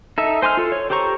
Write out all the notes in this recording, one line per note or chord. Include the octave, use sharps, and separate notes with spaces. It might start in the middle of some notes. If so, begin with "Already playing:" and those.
D#4 A4 E5
C5 G#5 C6 D6 F6
F4 A4
C#5
G4 A4 C5 A#5 C#6